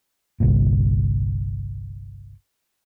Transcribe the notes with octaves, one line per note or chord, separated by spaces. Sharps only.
G1 C2 A#2